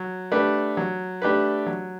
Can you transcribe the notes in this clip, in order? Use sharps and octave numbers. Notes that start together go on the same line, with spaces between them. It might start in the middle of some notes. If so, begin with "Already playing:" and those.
Already playing: F#3
A3 D4 G4 B4
F#3
A3 D4 G4 B4
F#3